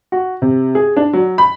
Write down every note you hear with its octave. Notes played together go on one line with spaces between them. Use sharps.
F#4
C3
G#4
D4
F#3
B5